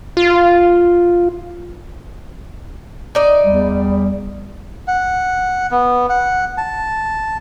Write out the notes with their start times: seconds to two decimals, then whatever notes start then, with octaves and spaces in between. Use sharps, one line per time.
0.17 F4
3.15 D#4 D5
3.44 E2 G3
4.88 F#5
5.71 B3
6.09 F#5
6.58 A5